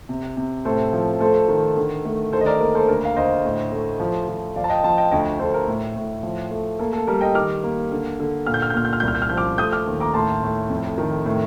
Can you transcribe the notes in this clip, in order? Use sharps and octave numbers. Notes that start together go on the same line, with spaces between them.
C3
C3
A2 A4 C5
F3
A3 A4 C5
D#3
D3
A3
D#3 A4 C5
D#5
A#4 D5
A#3 A#4
A4 C5
D2 A#4 D5
F5
D2 C5 D#5
A2
A3
F3
F3
F3 D5 F5
A5
D#5 G5
F3 F5 A5
D#5 G5
D2 D#5 G5
D2 A4 C5
A#4
A2
A2
F3
A3
A#3 A4
A4
G3 A#4
D#5 G5
D#3 D6 F6
A#3
D3
D3
A#2 F6
G6
F6
G6
A#2 F6
G6
F6
G6
C2 F6
G6
F6
F3 G6
D6 F6
A3 D#6 G6
D6 F6
D#2
A#5 D6
A2 A5 C6
A2
F2
D#3
A2